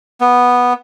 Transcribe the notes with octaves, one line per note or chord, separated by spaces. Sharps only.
B3